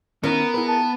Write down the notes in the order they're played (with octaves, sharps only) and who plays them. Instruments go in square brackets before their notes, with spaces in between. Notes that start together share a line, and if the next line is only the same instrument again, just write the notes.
[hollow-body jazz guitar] D#3 C#4 E4 [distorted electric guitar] B3 [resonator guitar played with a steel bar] A#4
[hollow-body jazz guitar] E4 G#4 B4
[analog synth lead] A5